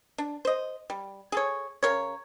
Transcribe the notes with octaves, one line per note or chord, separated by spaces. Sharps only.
D4
C5 D#5
G3
G#4 A4 C#5
C#3 A#4 C#5